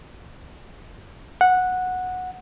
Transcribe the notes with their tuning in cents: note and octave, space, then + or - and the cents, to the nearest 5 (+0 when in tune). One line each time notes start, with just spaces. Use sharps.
F#5 -10